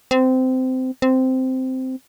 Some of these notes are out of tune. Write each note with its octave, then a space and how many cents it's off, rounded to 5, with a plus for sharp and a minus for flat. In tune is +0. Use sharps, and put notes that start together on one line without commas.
C4 -20
C4 -10